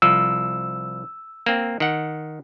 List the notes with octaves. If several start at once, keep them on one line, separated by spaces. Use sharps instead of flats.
C2 F3 E6
A#3 C4
D#3 F#5